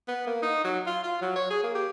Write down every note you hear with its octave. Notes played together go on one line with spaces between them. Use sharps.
B3
A#3
D#4
F#3
F4
F4
F#3
C#5
G#4
A#3
G4